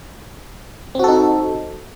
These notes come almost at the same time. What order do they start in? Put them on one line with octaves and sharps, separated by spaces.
C4 F#4 A4 D#4